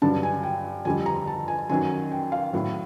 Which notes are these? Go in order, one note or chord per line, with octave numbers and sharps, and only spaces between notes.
G2 D3 F#3 A5
G#5
G5
F2 D3 G3 G#5
A#5
A5
G#5
F#2 D#3 F#3 G#5
G5
F5
A2 F#3